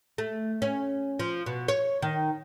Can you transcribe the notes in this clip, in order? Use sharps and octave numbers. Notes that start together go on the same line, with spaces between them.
A3
C#4
F3
B2
C#5
D#3